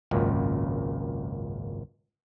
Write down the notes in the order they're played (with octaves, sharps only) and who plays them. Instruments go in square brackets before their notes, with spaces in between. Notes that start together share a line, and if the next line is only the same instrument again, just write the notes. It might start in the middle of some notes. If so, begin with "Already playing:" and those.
[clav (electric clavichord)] G#1 C#2 F#2 A#2